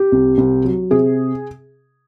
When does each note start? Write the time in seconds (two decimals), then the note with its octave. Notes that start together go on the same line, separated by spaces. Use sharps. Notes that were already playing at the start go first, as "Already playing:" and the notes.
Already playing: G4
0.12 C2
0.38 C2
0.65 F#3
0.90 C3 G#4